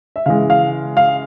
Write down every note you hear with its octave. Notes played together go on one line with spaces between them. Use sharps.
E5
C#3 E3 G#3 F5
F5
F5